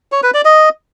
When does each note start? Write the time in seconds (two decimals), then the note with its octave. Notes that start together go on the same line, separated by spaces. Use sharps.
0.12 C#5
0.23 B4
0.34 D5
0.45 D#5